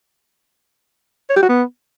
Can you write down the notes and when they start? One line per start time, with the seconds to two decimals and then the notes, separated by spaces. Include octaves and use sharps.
1.30 C#5
1.36 G4
1.43 F#4
1.49 B3